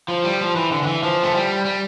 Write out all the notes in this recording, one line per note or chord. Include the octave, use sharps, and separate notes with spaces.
F3
G3
F3
E3
D3
D3
E3
F3
A3
G3
G3